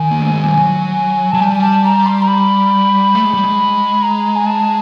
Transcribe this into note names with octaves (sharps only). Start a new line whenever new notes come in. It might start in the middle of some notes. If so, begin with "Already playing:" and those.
Already playing: D#3 G#5
A#3
A3
G#3
G3
F#3
F#3 A5
G3 G#5
G#5
A5
A#5
C6
A#5
B5
A3
G#3
G3
G#3
A#5
G#5
A5